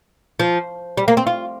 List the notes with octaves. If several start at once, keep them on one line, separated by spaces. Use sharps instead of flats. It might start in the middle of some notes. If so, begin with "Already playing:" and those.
F3
G3
A#3
C4
F4